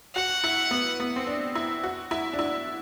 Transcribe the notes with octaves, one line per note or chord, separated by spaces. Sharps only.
F#4 F#5
E4
B3
B3
C4
D4
E4
F#4
E4
D4
E4